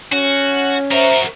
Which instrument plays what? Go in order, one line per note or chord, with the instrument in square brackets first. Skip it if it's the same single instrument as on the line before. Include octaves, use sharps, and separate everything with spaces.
[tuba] C#4 [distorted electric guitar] F#4
[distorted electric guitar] F#4 A#4 [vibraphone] C5 E5 A#5